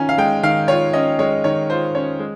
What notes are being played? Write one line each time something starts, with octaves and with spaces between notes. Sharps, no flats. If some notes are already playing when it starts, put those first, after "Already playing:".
Already playing: D#3 C#4 F4 G#5 A#5
F5
G#3 G5
D#3 F5
F4 C#5
C#4 D#5
G#3 C#5
D#3 C#5
F4 C5
C#4 C#5
G#3